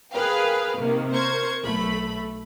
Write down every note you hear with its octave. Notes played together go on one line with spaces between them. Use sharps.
G#4 A#4 B4 F5 G5
C3 D#3 A#3
A#4 C5 C#6 G#6
B1 A3 B5